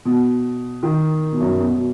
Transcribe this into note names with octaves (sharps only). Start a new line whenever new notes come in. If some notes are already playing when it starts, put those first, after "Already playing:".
B2
D#3
B2
F#2
B2
B2